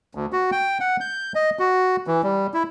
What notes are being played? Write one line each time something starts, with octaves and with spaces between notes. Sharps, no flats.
D2
F#4
G5
F#5
G6
D#5
F#4
E3
G3
E4